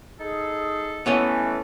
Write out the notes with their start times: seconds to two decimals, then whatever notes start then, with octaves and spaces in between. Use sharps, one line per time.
0.19 D#4 G#4 A4
1.06 E3 A3 B3 C#4 C#5 D#5